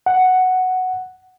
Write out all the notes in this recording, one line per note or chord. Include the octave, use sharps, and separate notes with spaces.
F#5